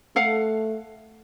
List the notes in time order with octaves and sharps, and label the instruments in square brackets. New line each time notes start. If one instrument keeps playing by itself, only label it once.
[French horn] A3 [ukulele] A4 F5 F#5